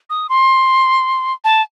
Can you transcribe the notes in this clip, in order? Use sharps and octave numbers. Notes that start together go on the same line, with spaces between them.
D#6
C6
A5